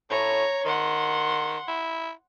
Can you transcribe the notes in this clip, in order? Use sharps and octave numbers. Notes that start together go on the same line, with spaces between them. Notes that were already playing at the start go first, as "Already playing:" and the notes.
A2 C#5 A#5
D#3 F#5 C6
E4